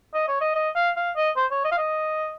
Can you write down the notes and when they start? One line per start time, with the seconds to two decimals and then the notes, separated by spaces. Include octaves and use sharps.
0.14 D#5
0.28 C#5
0.41 D#5
0.55 D#5
0.76 F5
0.96 F5
1.16 D#5
1.36 C5
1.51 C#5
1.65 D#5
1.72 F5
1.78 D#5